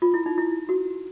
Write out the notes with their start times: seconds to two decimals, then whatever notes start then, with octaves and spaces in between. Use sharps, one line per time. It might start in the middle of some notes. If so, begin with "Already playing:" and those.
0.02 F4
0.14 E4
0.26 D#4
0.38 E4
0.69 F#4